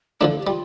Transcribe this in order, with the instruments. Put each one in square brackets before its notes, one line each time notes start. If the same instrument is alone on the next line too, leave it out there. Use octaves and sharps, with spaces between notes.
[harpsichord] D3 F3 A3 D4 [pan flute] A#4
[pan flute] A4
G4
[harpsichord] G3 [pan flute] F4